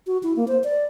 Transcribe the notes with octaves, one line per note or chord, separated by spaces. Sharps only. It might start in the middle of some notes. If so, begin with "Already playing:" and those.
F#4
E4
A#3
C5
D5